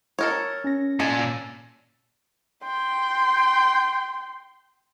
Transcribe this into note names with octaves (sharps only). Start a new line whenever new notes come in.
A4 A#4 C#5
C#4 A#6
A#2 A4 G#5
G5 C6